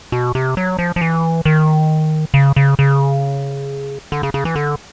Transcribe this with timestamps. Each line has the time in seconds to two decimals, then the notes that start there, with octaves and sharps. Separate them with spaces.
0.12 B2
0.35 C3
0.57 F#3
0.79 F3
0.96 F3
1.01 E3
1.45 D#3
2.34 C#3
2.56 C#3
2.79 C#3
4.12 D3
4.23 C#3
4.34 C#3
4.45 E3
4.56 D3